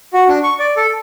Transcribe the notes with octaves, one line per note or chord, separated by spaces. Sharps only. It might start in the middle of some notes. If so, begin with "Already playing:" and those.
F#4
D4
C#6
D5
A4